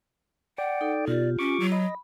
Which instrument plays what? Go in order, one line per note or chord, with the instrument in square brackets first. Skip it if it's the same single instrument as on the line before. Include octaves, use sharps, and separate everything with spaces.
[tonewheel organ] D5 G5 [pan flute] F#5
[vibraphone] D#4 A4
[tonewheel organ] B2 [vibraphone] F4 G4 [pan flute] D5
[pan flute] C#4 [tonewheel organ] C#6 D6
[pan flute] F#3
[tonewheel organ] D#5 [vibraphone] B5